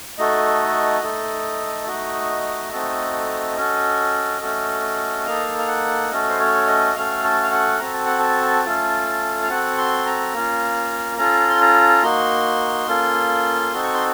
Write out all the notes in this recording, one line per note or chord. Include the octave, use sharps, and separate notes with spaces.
A3 D#4 F#4 A4 D#5
A3 D#4 A4
A3 D#4 F#4 D#5
A3 C4 D#4 F#4 A4
C#4 F#4 A4
A3 C#4 F#4 A4
A#3 D#4 A4 F5
F5
F#5
A3 C#4 F#4 A4 D#5
C5
C#5
D#5
A3 C#4 F#4 A4 F5
A5
F5
F#5
C4 F#4 A4 A#5
A5
F#5
A5
A3 C#4 F4 A4
F5
C4 F#4 A4 F#5
C6
A#5
A#3 C#4 F4
C#4 F4 A4 A#5
C6
A#5
A#3 D#4 F#4 C6
A#3 C#4 F4 A4
C4 D#4 F#4 A4
C#6
C6